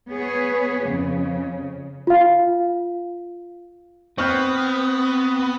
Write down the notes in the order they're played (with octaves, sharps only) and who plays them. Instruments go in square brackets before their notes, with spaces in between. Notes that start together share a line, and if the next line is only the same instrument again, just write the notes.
[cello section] B3 G#4 B4 C#5
F2 C#3
[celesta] F4 F5
[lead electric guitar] B3 [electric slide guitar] C4 [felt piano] C#6 F6 G6